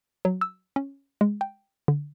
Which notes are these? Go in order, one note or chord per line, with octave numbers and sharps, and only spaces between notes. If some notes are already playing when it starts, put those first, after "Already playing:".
F#3
E6
C#4
G#3
G5
D3